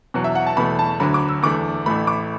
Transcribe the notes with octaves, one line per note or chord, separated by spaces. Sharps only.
E2 B2 F#3
E5
F#5
A5
E2 B2 A3 B5
A5
D2 D3 F#3 B5
D6
E6
E2 D3 A3 D6
A1 A2 A3 B5
D6